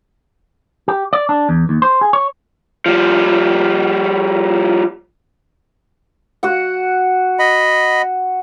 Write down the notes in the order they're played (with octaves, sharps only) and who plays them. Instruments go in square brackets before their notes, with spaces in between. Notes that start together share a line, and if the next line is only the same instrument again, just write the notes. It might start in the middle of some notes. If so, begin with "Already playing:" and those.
[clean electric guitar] G4
D5
D4
E2
D#2
C5
G#4
C#5
[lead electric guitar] F3 G3
[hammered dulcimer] F#4 F#5
[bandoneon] D#5 B5